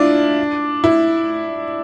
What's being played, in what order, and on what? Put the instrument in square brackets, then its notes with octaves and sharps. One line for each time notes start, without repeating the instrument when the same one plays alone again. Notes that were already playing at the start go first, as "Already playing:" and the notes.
Already playing: [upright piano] D4 E4 F4
E4